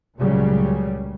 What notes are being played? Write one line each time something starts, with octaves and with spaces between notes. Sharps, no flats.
C#2 A#2 C#3 F#3 G3